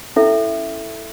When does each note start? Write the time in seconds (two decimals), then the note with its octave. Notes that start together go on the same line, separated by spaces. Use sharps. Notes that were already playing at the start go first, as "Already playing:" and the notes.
0.16 C#4 E4 A4 E5